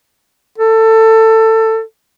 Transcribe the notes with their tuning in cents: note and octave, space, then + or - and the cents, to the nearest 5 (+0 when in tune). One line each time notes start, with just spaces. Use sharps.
A4 +20